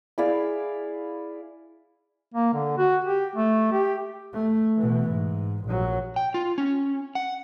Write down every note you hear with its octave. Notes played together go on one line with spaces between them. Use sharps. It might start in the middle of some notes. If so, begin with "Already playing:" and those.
E4 G#4 D5 F5
A#3
D3
F#4
G4
A3
G4
A3
B2 E3
G#2
A#1 F#3
G5
F4
C#4
F#5